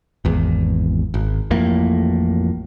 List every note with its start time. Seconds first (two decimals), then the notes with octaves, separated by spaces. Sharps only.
0.25 G#1 E2
1.14 G#1
1.51 A1 F2 A2 A#3